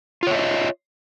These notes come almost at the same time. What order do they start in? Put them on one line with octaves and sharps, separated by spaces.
F4 C#5 E5 D#5